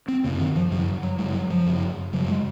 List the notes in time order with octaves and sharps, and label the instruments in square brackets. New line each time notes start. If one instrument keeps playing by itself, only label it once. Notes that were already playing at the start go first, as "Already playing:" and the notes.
[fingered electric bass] C4
F#2 C#3 A#3
D#3
F3
F#2 C#3 F#3
F#3
F#2 C#3 G#3
F#3
F3
F#2 C#3
F#2 C#3 F#3
G#3